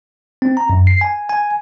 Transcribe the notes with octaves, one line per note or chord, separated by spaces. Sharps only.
C4
A#5
F#2
C7
G#5
G#5